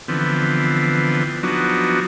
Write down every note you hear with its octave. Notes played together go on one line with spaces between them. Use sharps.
D3 E3 F3 B3 C4
F3 F#3 B3 D4 D#4 F#4